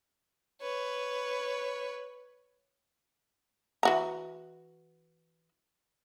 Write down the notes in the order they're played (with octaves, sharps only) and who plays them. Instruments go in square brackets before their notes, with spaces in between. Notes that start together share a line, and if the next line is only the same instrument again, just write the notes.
[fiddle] B4 C#5
[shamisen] E3 F#4 A#5